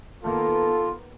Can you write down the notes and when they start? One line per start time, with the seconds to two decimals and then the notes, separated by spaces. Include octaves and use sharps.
0.23 D#3 A#3 B3 F4 A4